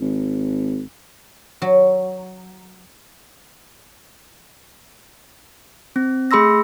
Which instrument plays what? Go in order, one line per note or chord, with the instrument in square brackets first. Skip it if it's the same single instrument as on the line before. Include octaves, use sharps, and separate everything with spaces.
[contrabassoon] G#1
[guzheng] F#3
[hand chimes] C4
A3 G#4 B5 C6 E6 A#6